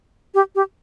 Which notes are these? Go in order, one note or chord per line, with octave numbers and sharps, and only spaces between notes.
G4
G4